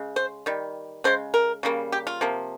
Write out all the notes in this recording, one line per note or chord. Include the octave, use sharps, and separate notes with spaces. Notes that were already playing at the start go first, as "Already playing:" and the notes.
Already playing: C#3 G#3
C5
D#3 G3
C#3 G#3 C5
A#4
C#3 G3 A#3
G4
F4
C3 F3 A#3